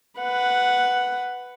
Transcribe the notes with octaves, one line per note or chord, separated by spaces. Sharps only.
B4 F#5